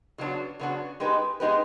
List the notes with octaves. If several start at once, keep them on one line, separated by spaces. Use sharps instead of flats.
C#3 F#3 B3 D4 F#4
C#3 F#3 B3 D4 F#4
G#3 B3 D#4 G4 B4
G#3 B3 D#4 G4 B4